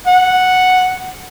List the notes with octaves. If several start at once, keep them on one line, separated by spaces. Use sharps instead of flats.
F#5